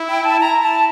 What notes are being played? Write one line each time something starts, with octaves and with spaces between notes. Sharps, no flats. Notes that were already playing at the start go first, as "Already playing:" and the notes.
Already playing: E4
G5
A5
E4 A#5
A5